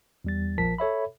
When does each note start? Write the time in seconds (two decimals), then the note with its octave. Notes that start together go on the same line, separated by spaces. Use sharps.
0.24 E2 G3 A6
0.58 A#1 F3 A#4 A5 B6
0.78 A4 C#5 E5 B5